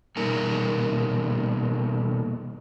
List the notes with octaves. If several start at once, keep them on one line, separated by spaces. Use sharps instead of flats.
B2 G3 A#3 D#4 A#4 G#5